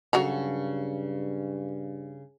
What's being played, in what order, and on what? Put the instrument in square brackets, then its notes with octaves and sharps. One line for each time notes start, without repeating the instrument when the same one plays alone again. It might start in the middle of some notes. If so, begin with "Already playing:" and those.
[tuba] G2 [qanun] C#3 A4 C#5 [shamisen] F#3 F#4 A#5